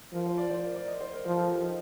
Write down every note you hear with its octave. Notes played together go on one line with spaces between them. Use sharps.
F3 A#4
C5
D5
C5
A#4
D5
D#5
C5
A#4
F3 C5
A4
G4
D#4